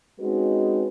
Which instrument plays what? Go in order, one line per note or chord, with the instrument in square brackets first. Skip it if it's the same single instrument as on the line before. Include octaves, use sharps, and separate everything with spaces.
[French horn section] G#3 C4 C#4 D#4 F#4 B4